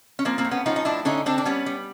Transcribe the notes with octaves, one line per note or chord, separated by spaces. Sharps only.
C#4
F3 A#3 C4
A#3 C4
A2
B3 C#4
F3 C#4 D#4
D#4
A2 D4 E4
D3 C#4 D#4
D3 C4 D4
D4
G3 B3 C#4
G3